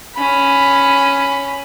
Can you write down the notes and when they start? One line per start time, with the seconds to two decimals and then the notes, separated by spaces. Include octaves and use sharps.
0.15 C#4 B5